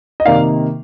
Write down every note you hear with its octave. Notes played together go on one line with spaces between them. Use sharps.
D#5
C3 D#3 A#3 D#4 D5 F5